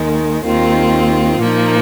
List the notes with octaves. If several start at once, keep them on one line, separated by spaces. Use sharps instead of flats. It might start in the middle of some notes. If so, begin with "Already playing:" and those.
Already playing: D#2 D#3 G#3
D#2 D#3 C4 F4
A#2 F3 A#3 D#4